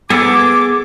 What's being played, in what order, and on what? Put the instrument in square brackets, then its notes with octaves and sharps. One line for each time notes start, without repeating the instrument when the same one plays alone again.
[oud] B3 [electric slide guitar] G#4 A4 [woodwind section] D6